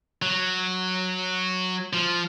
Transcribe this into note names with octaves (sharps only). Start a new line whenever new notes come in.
F#3
F3